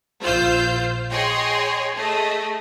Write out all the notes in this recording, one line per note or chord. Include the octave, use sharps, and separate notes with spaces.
A#1 F4 C5 F5 E6 G6
G#4 C#5 D#5 G5 C6
A3 G#4 D#5